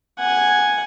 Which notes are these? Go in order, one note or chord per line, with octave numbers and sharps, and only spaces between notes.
F#5 G#5